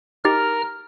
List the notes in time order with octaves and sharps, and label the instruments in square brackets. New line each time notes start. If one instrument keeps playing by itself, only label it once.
[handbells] D#4 G4 A6 [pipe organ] A#4 F6